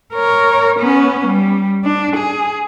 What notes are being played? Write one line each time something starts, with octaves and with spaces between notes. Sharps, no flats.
A#4 C#5
B3 C#4
G3
D4
G#4